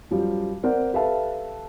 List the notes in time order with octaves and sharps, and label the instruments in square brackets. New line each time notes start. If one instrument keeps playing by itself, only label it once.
[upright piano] F#2 F3 G3
C4 A#4 C5 D5 F#5
G4 A4 B4 E5 F5 A5